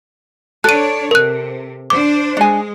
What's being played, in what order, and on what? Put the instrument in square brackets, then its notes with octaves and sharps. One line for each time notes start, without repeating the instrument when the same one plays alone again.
[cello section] D4 C#5 D5 [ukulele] A4 [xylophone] F#6 D#7
[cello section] C3 [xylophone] A#4 F#6
[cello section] D4 C5 [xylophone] D6
[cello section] G#3 [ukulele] D4 G#5